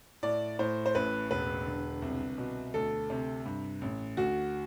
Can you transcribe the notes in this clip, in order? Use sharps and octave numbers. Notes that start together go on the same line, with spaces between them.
A2 D5
A2 C5
C5
A1 B4
E1 B4
D3
C2
B2
D2 A4
C3
G2
A1
D2 F#4